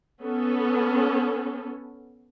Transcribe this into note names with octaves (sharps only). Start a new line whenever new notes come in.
B3 C#4 A4